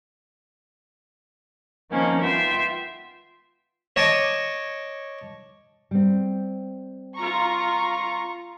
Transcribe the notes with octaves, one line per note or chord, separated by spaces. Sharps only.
D#3 F3 A#3 C4 C#4 D#4
B3 F4 E5 G5 C6
C#5 D#5 A5 D6
G3 C4
F4 A#5 C#6